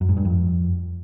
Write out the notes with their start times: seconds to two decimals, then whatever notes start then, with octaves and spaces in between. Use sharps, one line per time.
0.01 F#2
0.09 G#2
0.17 G2
0.25 F2